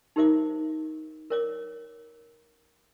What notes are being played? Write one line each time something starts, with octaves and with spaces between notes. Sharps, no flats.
D#4 G4 A#4 C5 E5 D6
A#4 C#5 D6